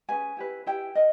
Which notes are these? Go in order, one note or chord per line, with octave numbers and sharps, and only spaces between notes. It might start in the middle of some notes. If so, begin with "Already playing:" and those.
C#4 G#4 B4 G#5
E4 G4 B4
E4 G4 B4 G5
A#4 D#5